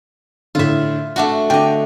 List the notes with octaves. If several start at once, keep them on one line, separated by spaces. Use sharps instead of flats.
A2 D3 F4 E5
A3 D4 F#4 F#5
D3 D#5 G5 D6